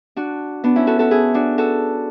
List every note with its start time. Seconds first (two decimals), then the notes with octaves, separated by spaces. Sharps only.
0.16 D4 F#4
0.64 B3 D4
0.76 C#4 E4
0.87 F#4 A4
0.99 F#4 A4
1.11 E4 G#4
1.34 D4 F#4
1.58 F#4 A4